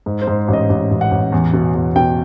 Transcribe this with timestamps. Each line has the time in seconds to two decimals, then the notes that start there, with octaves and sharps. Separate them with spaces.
0.06 G#2
0.22 C5
0.27 G#2
0.48 A1
0.53 D#5
0.69 A1
0.91 A1
1.01 F#5
1.11 A1
1.32 E2
1.53 B2
1.75 E2
1.96 B2 G5